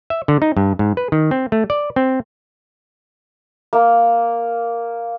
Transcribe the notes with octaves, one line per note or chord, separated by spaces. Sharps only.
E5
D3
D#4
G2
G#2
B4
D#3
C4
A3
D5
C4
A#3